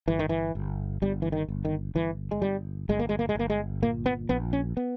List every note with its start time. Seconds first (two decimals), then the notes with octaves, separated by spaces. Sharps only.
0.08 G1 E3
0.19 D#3
0.29 E3
0.55 G1
1.02 G1 G3
1.22 E3
1.32 D#3
1.48 G1
1.65 D#3
1.95 G1 E3
2.31 G#3
2.42 G1 G3
2.89 G1 G#3
2.99 A#3
3.09 G#3
3.19 A#3
3.29 G#3
3.35 G1 A#3
3.50 G#3
3.83 A#2 A#3
4.06 B3
4.29 A#1 B3
4.53 C#4
4.77 B3